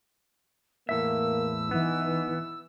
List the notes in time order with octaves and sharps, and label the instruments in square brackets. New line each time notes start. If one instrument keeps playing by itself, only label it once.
[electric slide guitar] E2 A2 E5 [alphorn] A#3 [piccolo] E6
[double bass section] E3 [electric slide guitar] B3 [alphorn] D#4